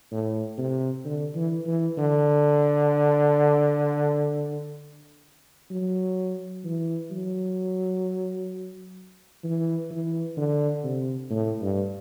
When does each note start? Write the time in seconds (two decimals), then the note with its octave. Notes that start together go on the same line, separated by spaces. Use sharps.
0.12 A2
0.58 C3
1.05 D3
1.35 E3
1.66 E3
1.98 D3
5.70 F#3
6.65 E3
7.11 F#3
9.44 E3
9.90 E3
10.37 D3
10.84 C3
11.30 A2
11.61 G2